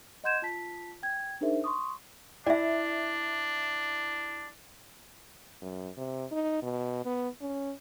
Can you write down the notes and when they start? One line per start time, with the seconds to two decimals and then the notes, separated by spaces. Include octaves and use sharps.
0.24 D#5 F#5 C6 G6 G#6 E7
0.42 F4 A5 B6
1.03 G5 G#6
1.41 D4 D#4 G#4 A#4 C5 E5
1.64 C6 C#6 D#6
2.47 D4 E4 D5 E5
5.61 F#2
5.97 C3
6.31 D#4
6.62 B2
7.05 B3
7.41 C#4